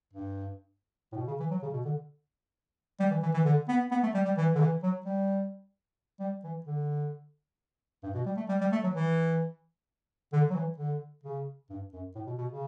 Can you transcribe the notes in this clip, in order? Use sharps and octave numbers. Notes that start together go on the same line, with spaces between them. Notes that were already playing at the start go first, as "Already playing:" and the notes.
G2
A2
B2
C#3
E3
F#3
C#3
B2
D3
G3
E3
E3
E3
D3
B3
B3
A3
G3
G3
E3
D3
E3
F#3
G3
G3
E3
D3
G2
B2
G3
A3
G3
G3
A3
F#3
E3
D3
F#3
E3
D3
C#3
G2
F#2
A2
B2
B2
C#3